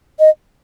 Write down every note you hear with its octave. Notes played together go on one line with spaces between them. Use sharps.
D#5